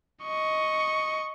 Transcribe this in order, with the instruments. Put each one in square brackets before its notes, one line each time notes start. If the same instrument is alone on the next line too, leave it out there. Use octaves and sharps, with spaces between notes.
[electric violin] D#5 C#6